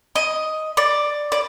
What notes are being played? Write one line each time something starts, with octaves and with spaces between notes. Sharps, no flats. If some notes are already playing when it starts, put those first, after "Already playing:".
D#5
D5
D5